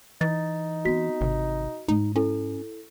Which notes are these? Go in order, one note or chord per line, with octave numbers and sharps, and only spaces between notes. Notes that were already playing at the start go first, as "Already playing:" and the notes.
E3 D#4 A6
B3 C4 F#4 B6
G#1 C3 E3
G#2 D#4
C#4 E4 A4